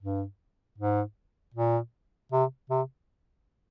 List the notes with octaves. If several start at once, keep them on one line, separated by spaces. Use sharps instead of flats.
G2
G#2
A#2
C3
C3